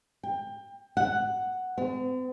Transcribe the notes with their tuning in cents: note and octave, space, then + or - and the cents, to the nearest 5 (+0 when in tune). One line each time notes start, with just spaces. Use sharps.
G5 +25
F#5 +0
C4 -45